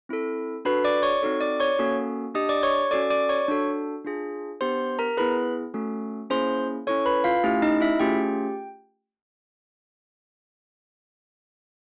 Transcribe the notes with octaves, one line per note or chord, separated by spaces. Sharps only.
C4 E4 A4
D4 F#4 A4 B4 B5
D5 D6
C#5 C#6
C4 D#4 F#4 A4
D5 D6
C#5 C#6
A#3 C#4 F#4 A4
D4 G4 D#5 D#6
D5 D6
C#5 C#6
C#4 F#4 A4 D5 D6
D5 D6
C#5 C#6
D4 F#4 A4
D4 F4 G#4
B3 D4 G4 C5 C6
A#4 A#5
B3 E4 G#4 B4 B5
A3 C#4 F#4 A4
A#3 C#4 E4 G#4 C5 C6
C#4 E4 A4 C#5 C#6
B4 B5
F4 F5
A3 C#4 E4 G4
D#4 D#5
E4 E5
A3 C#4 F4 G4 G#4 G5